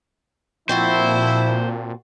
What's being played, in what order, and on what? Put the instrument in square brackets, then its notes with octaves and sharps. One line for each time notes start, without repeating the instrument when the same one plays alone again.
[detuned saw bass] A#2 [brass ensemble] F3 E4 [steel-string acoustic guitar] C4 F#4 A4 [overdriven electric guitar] C5